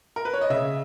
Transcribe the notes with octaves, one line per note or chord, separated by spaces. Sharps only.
A#4
B4
C#5
D#5
C#3 E5